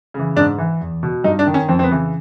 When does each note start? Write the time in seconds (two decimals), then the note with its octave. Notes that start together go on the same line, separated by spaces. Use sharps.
0.14 C#3 E3
0.36 G#2 D4
0.58 E3
0.81 E2
1.03 B2
1.24 G2 D#4
1.39 D4
1.47 D#3
1.54 C#4
1.68 F2 C4
1.79 C4
1.83 B3
1.90 C#3 E3